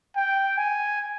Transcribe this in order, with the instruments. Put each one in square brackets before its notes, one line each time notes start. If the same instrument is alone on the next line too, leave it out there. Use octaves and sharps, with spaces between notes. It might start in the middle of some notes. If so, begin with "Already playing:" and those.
[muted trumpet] G5
G#5